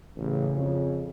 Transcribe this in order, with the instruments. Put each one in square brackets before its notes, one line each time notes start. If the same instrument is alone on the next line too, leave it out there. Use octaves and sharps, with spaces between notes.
[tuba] A1 [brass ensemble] C#3
[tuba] F2